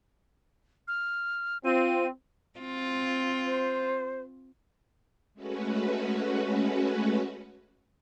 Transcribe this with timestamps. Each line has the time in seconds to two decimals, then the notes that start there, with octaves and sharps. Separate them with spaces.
0.88 F6
1.65 C4 F4 D#7
2.59 C4 F4
3.45 C5
5.34 G#3 A3 C#4 F#4 B4